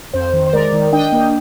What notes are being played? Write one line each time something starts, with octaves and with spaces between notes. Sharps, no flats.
F2 C5
D#3
C5
G#3 A#4 D5
D#3
D4 D#5 G5
A#3